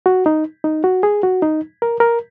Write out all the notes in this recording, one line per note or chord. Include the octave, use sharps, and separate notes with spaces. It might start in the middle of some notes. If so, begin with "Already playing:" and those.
F#4
D#4
D#4
F#4
G#4
F#4
D#4
A#4
A#4